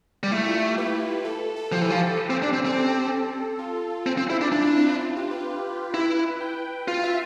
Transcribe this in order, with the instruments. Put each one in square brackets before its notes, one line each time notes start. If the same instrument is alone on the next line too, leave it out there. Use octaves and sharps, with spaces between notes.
[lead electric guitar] G3
[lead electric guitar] A3 [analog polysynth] E4
[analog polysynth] F4
G4
B4
A4
A4
[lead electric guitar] F3 [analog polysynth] G4
[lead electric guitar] E3
F3
C4
D4
C4
[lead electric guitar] C4 [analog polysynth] A4
[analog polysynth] F4
[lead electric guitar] C4
C4
E4
D4
[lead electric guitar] D4 [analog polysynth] F4
[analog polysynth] E4
C4
C4
F4
G4
B4
[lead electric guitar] E4
[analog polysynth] G5
[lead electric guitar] F4 [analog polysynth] F5
[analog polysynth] E5